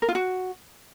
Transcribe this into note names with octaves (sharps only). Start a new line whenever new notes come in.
A#4
F4
F#4